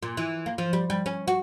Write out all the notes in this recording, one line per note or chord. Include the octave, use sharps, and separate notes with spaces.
A#2
E3
A#3
F3
G3
G3
C#4
F#4